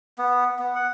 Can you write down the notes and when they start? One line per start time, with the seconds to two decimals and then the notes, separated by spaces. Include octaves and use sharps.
0.18 B3
0.59 B3
0.75 F#5